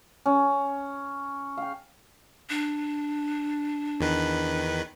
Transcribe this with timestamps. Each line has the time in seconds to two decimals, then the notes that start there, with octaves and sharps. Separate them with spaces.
0.26 C#4
1.58 F5 G5
2.50 D4
4.01 E2 D#3 B4